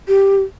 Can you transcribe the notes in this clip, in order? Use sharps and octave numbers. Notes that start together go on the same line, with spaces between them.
G4